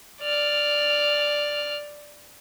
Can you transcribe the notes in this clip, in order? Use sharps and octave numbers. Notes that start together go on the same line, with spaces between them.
D5 F6